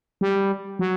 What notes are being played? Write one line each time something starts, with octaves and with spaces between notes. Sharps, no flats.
G3
F#3